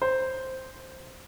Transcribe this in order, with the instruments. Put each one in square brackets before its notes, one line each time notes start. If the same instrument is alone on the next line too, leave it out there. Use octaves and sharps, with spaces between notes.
[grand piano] C5